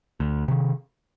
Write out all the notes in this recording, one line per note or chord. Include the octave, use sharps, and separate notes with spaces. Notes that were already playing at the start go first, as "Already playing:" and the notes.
D2
C3 D#3